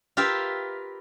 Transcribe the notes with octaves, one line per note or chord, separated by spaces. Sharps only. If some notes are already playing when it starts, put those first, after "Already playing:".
F4 G4 A#4 B4 E5